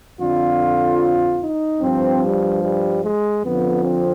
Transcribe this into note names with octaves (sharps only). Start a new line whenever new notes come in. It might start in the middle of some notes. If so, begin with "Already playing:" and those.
F2 D3 F3 F4
D#4
G2 F3 C4
G3
G3
G#3
F2 D3 F3 B3
C4